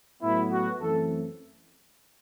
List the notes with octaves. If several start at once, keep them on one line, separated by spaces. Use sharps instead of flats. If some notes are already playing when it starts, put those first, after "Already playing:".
A2 F#3 B3 E4
F#4
F#2 E3 A3 C4 A4